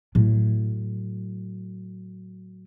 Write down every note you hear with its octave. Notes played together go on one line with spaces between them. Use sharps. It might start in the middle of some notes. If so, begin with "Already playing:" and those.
A2 F#3